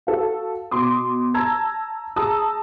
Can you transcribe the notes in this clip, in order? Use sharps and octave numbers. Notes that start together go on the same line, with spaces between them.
F#4 A4 F5
B2 C6 D6 D#6
A5 A#5 E6 G#6
G#4 A5 A#5 D#6 E6